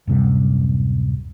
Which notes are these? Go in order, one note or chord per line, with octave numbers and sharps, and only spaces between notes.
D1 F#2 C3 G3